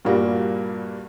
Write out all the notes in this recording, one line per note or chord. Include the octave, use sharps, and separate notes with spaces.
G2 A#2 G3 A#3 F#4